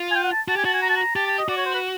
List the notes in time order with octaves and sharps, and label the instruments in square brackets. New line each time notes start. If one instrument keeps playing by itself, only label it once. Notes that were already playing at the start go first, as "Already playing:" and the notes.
Already playing: [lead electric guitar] F4
[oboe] G#5
G5
F#5
A5
[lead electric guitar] F#4 [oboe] A5
[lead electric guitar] G4 [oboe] G#5
[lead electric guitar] F#4 [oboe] A5
[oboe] G#5
A#5
A5
A#5
[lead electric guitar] G4 [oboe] A5
[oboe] A5
D#5
[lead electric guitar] F#4 [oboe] D5
[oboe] C#5
C5
B4